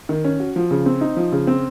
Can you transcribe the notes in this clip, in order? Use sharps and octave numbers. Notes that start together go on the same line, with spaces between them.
D#3
C#4
F#4
F3
C#3
C4
D#4
F3
C#3
C4